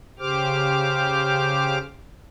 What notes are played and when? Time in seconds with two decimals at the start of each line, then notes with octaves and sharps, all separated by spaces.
0.19 C#3 G4 C5 D6 F6